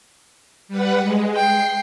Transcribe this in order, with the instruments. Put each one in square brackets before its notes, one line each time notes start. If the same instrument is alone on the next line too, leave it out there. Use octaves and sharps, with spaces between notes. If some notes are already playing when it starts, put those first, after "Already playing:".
[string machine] G3 B4 F#5
G#3
[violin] G5 [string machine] C7